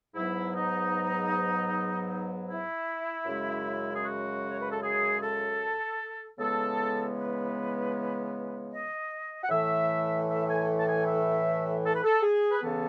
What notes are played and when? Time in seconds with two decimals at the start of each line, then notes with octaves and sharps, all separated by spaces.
0.14 G#2 F#3 B3 E4
0.54 D#4
2.49 E4
3.26 F#2 C#3 G#3
3.93 G#4
4.04 F#4
4.47 C#5
4.59 B4
4.71 A4
4.82 G#4
5.21 A4
6.38 C#3 E3 G#3 B3 A4
7.16 B4
8.72 D#5
9.43 F#5
9.49 A2 E3 A3 E5
10.28 E5
10.47 G#5
10.77 A5
10.86 G#5
11.05 E5
11.84 A4
11.94 B4
12.04 A4
12.22 G#4
12.50 B4
12.61 C#3 E3 B3 A4